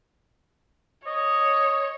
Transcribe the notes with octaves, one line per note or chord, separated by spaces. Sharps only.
C#5 D#5